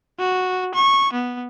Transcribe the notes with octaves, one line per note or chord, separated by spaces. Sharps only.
F#4
C#6
B3